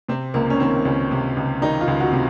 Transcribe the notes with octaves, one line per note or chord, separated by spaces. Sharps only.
C3 C4
C#2 A#3
C#4
D#3 C4
C#2 C#4
C3
C#2
D#3 D#4
F4
C#2
F#4
C3